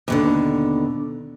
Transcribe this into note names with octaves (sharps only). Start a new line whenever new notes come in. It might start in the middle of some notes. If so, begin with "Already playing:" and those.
D#2 B2 D3